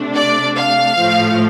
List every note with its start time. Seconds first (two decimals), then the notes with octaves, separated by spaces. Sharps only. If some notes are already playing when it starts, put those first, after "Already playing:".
Already playing: C3 A3 D4
0.15 D5
0.56 F5
0.96 A2 F3 A3